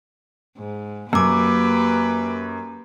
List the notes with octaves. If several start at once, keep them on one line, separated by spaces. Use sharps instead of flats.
G#2
F#2 A#3 G4 B4 D6 E6